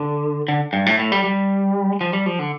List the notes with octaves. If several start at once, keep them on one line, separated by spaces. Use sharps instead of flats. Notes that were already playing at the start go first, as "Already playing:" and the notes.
Already playing: D3
D3
G2
A2
A2
G3
G3
F3
G3
F3
D3